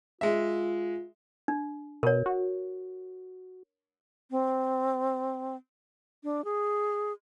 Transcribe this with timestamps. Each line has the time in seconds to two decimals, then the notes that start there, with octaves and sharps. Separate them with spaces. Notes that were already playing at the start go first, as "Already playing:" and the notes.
0.21 G#3 F4 E5
1.48 D4
2.03 B2 A#4 C#5
2.26 F#4
4.31 C4
6.24 D4
6.45 G#4